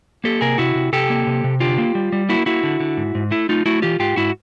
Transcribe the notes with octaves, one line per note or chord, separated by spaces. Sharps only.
A#3 G4 A4
C3 G#4 A#4
C3 E4 F#4
C3
C3 G4 A4
A#3
C3
C3
D3 F4 G4
A#3
G3
G3
A#3 E4 F#4
A#3 E4 F#4
D3
D3
G#2
G#2
A3 E4
A3 D#4 F4
A3 E4 F#4
E3 F4 G4
G#2 F4 G4
G#2 E4 F#4